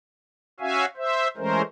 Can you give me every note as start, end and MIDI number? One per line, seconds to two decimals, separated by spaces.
0.60 0.85 61
0.60 0.85 66
0.60 0.85 76
0.60 0.85 77
0.60 0.85 80
0.97 1.28 72
0.97 1.28 76
1.37 1.62 52
1.37 1.62 56
1.37 1.62 57
1.37 1.62 61
1.37 1.62 70
1.37 1.62 72